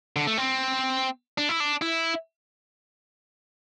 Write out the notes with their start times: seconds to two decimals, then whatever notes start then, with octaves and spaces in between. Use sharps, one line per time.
0.16 D3
0.27 A3
0.38 C4
1.38 D4
1.49 E4
1.60 D4
1.82 E4